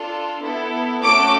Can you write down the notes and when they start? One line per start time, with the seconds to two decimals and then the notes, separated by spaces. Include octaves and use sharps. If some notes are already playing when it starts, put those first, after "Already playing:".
Already playing: D4 F4 A4
0.44 B3 E4 A4
1.03 A3 C#4 F#4 A4 D6